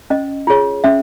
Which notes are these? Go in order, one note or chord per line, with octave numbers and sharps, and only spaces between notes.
C#4 D#5
F4 G#4 C#5
C#4 E5